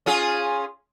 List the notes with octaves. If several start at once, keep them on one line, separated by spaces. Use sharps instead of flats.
C#4 F4 G#4